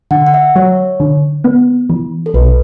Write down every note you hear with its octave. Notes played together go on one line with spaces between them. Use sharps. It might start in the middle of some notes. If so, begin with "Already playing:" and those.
D3 F#5
F#5
E5
F#3 C#5
D3
B3
E3
A4
B1 B4